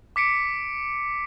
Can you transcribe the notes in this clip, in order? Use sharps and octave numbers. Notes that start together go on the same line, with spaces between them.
D6 B6 C#7 D7